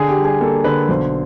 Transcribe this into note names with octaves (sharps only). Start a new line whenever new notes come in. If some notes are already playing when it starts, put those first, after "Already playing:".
Already playing: D3 G#4
G4
G3
G#4
A#3 A4
D3 B4
B1 C5